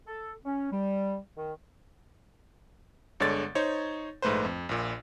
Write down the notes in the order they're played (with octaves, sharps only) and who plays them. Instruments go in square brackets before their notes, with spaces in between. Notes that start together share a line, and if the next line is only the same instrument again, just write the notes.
[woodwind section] A4
C#4
G3
D#3
[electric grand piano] G1 D3 G#3 C#5 D5 A6
D#4 C5 C#5 C#6
A#1 G#2 A3 B4 C5
F2
A#1 A#2